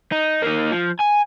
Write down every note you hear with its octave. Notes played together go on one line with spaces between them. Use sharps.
D#4
A#3 D#4
F3
G#5